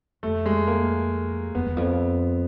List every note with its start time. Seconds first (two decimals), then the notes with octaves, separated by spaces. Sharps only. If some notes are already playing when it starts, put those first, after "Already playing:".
0.23 F2 A3
0.46 G#3
0.67 A#3
1.55 F2 B3
1.66 E2
1.77 F2